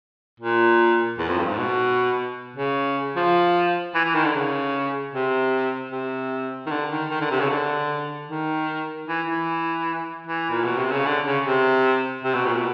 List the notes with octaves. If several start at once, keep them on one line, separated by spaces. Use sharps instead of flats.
A#2
E2
F2
G2
G#2
B2
C#3
F3
E3
E3
D#3
D3
C#3
C3
C3
D#3
D3
D#3
D#3
D3
C3
C#3
D3
D#3
E3
E3
E3
A#2
B2
C3
C#3
D3
C#3
C3
C3
B2
A#2
B2